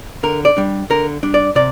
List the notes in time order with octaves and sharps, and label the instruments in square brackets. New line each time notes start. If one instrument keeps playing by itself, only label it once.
[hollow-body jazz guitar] D3 A#4
D5
G3 D4
D3 A#4
G3 D4
D5
C3 D5